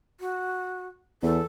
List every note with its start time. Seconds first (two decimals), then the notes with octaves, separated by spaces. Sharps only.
0.20 F#4
1.23 E2 A4